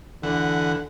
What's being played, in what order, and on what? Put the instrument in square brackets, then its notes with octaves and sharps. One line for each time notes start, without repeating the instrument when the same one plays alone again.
[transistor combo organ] D2 E3 F#5 [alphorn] D3